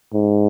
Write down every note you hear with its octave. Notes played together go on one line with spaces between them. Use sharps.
G#2